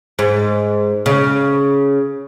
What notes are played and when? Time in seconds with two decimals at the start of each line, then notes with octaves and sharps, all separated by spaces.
0.19 G#2
1.06 C#3